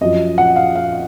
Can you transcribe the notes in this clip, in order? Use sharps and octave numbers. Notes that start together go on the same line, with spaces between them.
F#2 F3 D#5
F#5
F5
F5